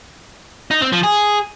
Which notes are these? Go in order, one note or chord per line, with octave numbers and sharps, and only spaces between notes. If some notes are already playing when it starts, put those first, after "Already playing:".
D#4
C4
F3
G#4